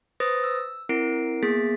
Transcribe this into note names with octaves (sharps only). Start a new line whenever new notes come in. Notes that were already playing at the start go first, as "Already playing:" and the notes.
B4 C5 D#6 A6 A#6
E6
C4 E4 A#4 C7 D7
A#3 B3 G#4 A6 B6